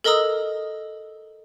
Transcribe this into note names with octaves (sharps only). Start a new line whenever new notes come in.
A4 A#4 D#5 A#5 D#6 E6